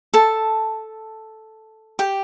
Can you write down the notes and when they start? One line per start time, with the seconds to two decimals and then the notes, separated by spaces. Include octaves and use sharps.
0.14 A4 A5
1.99 G4 G5